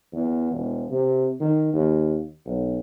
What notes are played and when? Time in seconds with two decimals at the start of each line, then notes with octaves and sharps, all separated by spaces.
0.13 E2
0.53 E1
0.91 C3
1.40 D#3
1.74 D#2
2.46 B1